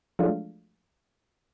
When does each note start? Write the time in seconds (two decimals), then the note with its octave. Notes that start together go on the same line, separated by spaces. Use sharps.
0.19 F3 F#3 G#3 A3 D4 F4